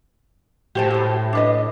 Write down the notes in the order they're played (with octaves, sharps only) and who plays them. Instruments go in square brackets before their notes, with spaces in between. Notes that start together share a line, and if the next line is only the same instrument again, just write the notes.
[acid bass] A2 [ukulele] G4 C5 A5
[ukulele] G4 C5
D4 B4 D#5